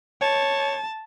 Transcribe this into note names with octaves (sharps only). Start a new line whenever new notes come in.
C#5 A5